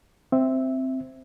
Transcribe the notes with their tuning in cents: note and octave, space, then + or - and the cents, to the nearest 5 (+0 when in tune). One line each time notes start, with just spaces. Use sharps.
C4 +0 E5 +0